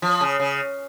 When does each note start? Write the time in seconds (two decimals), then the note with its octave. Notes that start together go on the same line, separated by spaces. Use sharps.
0.02 F3
0.21 C#3
0.40 C#3